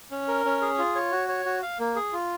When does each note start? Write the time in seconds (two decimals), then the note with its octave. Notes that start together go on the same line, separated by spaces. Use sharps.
0.11 C#4
0.28 A#4
0.45 C#4
0.61 G#4
0.78 F4
0.95 C#5
1.12 F#4
1.28 C#5
1.46 F#4
1.62 F5
1.79 A#3
1.96 G#4
2.13 F4